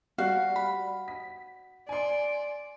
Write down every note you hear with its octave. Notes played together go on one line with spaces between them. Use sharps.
G3 F#4 F5
B5
B6
D5 G#5 C6